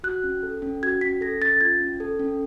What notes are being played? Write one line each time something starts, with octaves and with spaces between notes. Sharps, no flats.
F#4 F#6
C#4
A4
C#4
F#4 G#6
C#4 B6
A4 A#6
C#4 A6
F4 G#6
C#4
A4
C#4